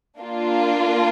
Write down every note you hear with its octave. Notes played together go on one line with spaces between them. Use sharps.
A#3 D4 F4